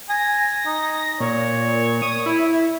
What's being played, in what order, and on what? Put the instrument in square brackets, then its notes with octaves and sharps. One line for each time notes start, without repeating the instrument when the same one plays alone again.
[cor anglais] G#5 [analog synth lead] A#6
[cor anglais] D#4
[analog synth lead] A#2 [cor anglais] C#5
[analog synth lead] D#6
E4